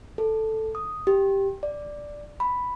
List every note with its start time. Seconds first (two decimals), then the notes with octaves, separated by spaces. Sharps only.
0.18 A4
0.75 D#6
1.07 G4
1.63 D5
2.40 B5